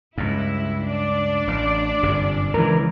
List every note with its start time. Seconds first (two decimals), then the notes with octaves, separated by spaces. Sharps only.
0.18 C#2 G2 E4
0.86 D4 D5
1.48 A1
2.03 G1 F#2 C3
2.54 C#2 C#3 E3 A#4